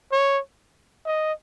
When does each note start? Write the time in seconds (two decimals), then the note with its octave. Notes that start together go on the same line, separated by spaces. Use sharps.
0.12 C#5
1.05 D#5